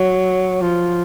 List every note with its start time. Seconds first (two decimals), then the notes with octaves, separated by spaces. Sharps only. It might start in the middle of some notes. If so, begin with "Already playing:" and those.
Already playing: F#3
0.61 F3